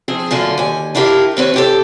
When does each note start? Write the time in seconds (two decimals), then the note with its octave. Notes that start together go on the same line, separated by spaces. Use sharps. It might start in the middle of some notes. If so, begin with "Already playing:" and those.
0.08 F3 C4 G#4
0.31 F#2 A#2 D3 F4 G#5
0.58 D#2 G#5
0.95 D4 E4 F4 G4 G#4 A#4
1.37 D#2 C4 B4 C#5
1.54 C3 G4 A4